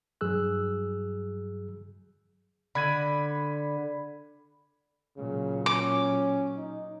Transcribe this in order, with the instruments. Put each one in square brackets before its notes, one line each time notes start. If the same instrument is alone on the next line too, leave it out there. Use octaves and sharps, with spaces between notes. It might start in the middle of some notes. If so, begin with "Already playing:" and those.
[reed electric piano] G2 F#3 G#4 E6 F#6
[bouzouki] D3 [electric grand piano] B5 G#6 D#7
[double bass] A#2 F#3 [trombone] C#3
[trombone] C#4 [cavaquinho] D6
[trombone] D#4